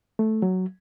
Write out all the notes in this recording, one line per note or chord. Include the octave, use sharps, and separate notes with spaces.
A3
F#3